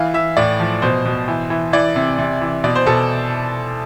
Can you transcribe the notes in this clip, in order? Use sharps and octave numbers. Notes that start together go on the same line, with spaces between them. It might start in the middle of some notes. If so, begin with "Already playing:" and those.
Already playing: E3 F5
E3 E5
A2 D5
F3
B2 C5
B2
E3
E3
E3 D5
C3
C3
E3
B2 D5
C5
B2 A4